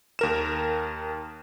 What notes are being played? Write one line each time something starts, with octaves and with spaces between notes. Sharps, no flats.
D#2 A#4 E7